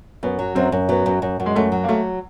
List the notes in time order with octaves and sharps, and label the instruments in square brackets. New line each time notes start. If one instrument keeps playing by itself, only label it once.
[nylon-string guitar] F#2 [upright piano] B3
[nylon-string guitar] F#3
[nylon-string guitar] F#2 [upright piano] C4
[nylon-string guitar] F#2
[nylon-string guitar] F#3 [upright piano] B3
[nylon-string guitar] F#2
F#2
F#2
[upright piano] G#3
[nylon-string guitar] F#2 [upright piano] A3
[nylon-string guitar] F#3
[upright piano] A#3
[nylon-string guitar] F#3 [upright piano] A3